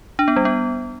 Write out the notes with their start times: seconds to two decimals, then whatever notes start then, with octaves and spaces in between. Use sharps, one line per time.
0.19 D4
0.28 B3
0.36 G3
0.45 B3